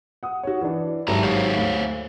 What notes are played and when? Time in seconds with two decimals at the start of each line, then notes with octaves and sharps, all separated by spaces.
0.23 F#5 D#6
0.43 F#4 C#5
0.61 E3 D4
1.08 G#1 F#3 G4 E5 A5 A#5
1.24 C5 C#5 F5
1.57 D2 G7